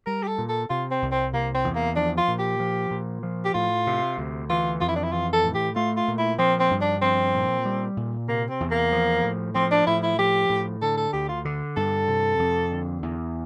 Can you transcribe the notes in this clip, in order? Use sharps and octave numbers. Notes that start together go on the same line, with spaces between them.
G3 A#4
G4
A4
A#2
A4
C3 F4
C4
C2
C4
C3 A#3
C4
E2
A#3
F3 D4
F4
A#2
G4
F3
A#2
F3
G4
A2 F4
C3
D2
E3 F4
F2 F4
E4
D4
E4
E3 F4
A4
A2
G4
A3 F4
F4
A#2
E4
F3 C4
C4
G2
D4
F3 C4
A#2
G3
A#2
C3 A#3
C4
E2
A#3
F3
A2
F3 C4
D4
A2 E4
E4
F3 G4
A2
D3 A4
A4
D2 G4
F4
D3
G2 A4
C3
F2
D3
E2